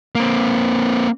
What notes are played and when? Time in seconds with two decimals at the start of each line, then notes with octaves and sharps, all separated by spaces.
0.15 A#3 C4